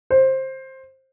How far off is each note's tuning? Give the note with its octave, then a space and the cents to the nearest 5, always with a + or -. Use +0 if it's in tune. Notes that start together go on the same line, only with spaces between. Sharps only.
C5 +15